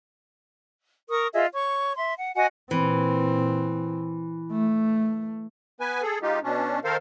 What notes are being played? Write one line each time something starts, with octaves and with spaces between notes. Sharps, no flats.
A#4 C#6 D#6
F4 G#4 D#5 E5
C#5 C#6
E5 C6
F#5
F#4 D#5 F#5 G#5
A#2 E3 C4
A3
B3 B4 G#5
G#4 A4
G#3 D#4 F4 G4
B2 C#4 D4
D#3 A4 A#4 C5 F5